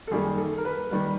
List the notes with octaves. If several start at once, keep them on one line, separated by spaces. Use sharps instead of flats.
A4
F#2 D#3 G3 A#3 G#4
A4
A#4
B4
D#3 G3 A#3